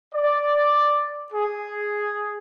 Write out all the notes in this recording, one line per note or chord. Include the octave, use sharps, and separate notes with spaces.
D5
G#4